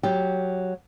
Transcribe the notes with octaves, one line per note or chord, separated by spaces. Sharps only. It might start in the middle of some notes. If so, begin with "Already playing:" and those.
F#3 G4